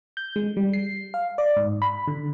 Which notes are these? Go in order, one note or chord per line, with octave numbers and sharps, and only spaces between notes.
G6
G#3
G3
C7
F5
D5
G#2
B5
D3